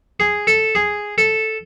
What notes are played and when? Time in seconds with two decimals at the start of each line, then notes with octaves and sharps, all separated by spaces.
0.20 G#4
0.47 A4
0.75 G#4
1.18 A4